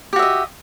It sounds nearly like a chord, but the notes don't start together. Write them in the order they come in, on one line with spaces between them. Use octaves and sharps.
G4 F#4 E5 D#5